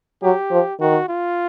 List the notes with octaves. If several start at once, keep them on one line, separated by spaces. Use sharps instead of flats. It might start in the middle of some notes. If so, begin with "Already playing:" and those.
F#3 G4
F3
D#3 F#4
F4